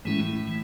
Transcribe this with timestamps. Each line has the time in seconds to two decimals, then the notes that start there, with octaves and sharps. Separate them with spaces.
0.05 A2 E3 G#3 C#4 E4
0.48 E3